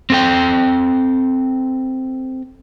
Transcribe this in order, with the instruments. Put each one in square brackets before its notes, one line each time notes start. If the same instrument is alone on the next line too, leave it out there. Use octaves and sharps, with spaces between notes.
[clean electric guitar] C4 A4 G5